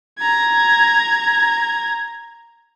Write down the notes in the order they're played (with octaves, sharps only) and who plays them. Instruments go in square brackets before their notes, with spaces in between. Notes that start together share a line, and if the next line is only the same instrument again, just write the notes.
[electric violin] A#5 G#6